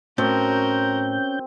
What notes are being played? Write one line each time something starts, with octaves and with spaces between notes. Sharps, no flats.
A2 C4 C#4 F#4 A#4 G6